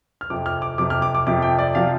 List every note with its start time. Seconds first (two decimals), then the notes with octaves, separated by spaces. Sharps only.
0.21 F6
0.30 F2 C3 F3 D6
0.46 F6
0.62 D6
0.78 F2 C3 F3 D6
0.90 F6
1.02 D6
1.15 D6
1.26 F2 C3 F3 D6
1.42 G5
1.59 D5
1.75 C3 F3 F5